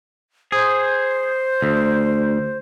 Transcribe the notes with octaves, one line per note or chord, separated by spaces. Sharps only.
G#4 C5
D2